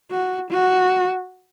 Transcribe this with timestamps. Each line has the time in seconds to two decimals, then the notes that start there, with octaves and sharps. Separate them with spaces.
0.11 F#4
0.51 F#4